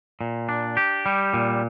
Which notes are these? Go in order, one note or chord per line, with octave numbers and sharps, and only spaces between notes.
A#2
D4
G4
G3
A#2